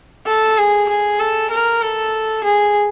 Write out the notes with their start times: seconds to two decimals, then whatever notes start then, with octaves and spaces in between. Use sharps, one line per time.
0.27 A4
0.58 G#4
0.89 G#4
1.20 A4
1.50 A#4
1.82 A4
2.44 G#4